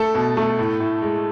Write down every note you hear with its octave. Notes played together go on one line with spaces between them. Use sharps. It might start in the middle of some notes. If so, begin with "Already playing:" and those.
Already playing: A3 A4
B2
A3
A2
A2
G#3